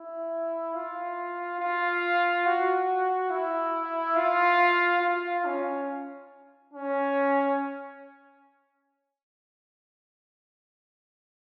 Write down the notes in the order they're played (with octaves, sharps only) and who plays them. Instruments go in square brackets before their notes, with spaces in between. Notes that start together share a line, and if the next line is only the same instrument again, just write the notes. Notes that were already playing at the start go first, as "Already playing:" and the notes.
Already playing: [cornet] E4
F4
F4
F#4
E4
F4
F4
C#4
C#4